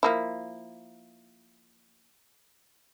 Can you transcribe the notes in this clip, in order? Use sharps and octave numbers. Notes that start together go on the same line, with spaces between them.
F3 A#3 E4